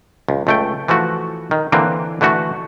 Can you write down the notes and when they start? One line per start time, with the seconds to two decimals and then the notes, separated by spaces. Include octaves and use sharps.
0.29 C#2
0.47 C#2 A3 G5
0.88 E3 F3 A3 F#4
1.51 D#3
1.72 D3 E3 A#3 C4
2.21 D3 E3 A3 F#4